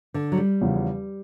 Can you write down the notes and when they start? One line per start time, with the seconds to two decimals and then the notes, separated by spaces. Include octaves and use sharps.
0.14 D3
0.32 F#3
0.38 G3
0.61 E2 C#3 F3